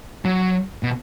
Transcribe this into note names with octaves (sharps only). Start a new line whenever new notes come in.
F#3
B2